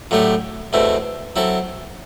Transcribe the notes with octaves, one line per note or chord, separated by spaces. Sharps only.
A2 F#3 A3 D4 G4
E2 B2 A3 C4 E4
F#3 C4 E4 A4